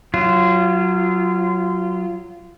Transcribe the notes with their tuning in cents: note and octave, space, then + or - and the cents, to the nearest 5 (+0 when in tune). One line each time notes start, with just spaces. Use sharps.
F#3 +0 F4 -25